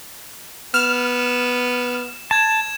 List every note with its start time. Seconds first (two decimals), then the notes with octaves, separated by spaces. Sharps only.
0.74 B3 F6 E7
2.31 A5 G#6 E7